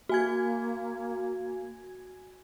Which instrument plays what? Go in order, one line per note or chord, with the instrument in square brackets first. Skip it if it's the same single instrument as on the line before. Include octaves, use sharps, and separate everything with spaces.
[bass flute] A#3 [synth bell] F#4 G#5 G#6